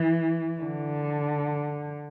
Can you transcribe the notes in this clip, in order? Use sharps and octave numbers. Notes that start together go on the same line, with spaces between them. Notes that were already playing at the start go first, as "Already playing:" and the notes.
Already playing: E3
D3